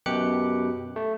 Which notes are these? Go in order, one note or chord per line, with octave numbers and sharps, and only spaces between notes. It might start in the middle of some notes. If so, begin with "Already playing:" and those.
F#2 B2 G4 D6 F#6 C#7
A3